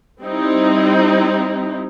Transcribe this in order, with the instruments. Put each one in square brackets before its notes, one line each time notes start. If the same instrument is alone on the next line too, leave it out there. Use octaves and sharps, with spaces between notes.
[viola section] G3 C4 D#4 E4